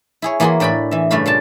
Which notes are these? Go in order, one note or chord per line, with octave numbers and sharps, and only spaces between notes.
E4 G#4 C#5
E3 A#3 F#4 G#4 B5 C6
A2 D4 G5 G#5 B5
E3 E5
G2 C#3 A3 D4 F5 B5
A#2 F5 G5 A5